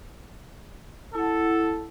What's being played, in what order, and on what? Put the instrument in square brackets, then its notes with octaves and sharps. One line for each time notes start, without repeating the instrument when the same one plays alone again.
[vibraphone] E4 F#5 [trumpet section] A4